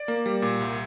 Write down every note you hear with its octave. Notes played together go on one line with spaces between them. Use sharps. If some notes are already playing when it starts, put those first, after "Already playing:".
Already playing: D5
A#3
G3
A#2
C2